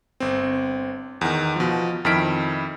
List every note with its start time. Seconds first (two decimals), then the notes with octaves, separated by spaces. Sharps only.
0.20 G1 C4
1.21 E2 D#3
1.56 B2 F3
2.05 F2 D#3 E4 F6 B6 D7